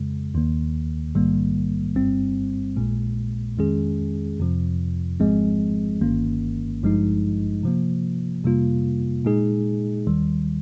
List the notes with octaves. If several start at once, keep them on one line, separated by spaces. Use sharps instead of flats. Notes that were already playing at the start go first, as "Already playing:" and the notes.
Already playing: F2 C#3 G#3
D#2 D#3 A#3
A#1 G#2 D#3 G3 A#3
G1 G2 G3 C4
A#1 A#2 G#3
F2 D#3 G#3 C#4 G#4
F2 C3 F3
G#1 G#2 F3 G#3 C4
G1 G2 D#3 A#3 C#4
G#1 G2 F3 G#3 D#4
C3 F3 A#3
F2 C3 G3 A#3 F4
A#2 G#3 D#4 G#4
D#2 D#3 G3